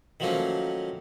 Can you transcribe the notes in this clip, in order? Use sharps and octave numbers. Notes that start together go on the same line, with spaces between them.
D#3 F3 F#3 A3 A#3 C#4